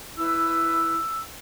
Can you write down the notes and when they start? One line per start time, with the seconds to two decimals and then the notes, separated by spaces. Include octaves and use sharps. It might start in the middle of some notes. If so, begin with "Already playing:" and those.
0.16 E4 B4 E6